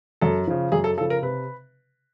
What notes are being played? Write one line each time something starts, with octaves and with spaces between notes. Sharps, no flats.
F#2 A4
C#3 F3
F#2 G#4
A4
C#3 F3 A4
A#4
C3 B4